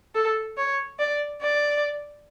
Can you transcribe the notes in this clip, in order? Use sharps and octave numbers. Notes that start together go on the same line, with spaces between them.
A4
C#5
D5
D5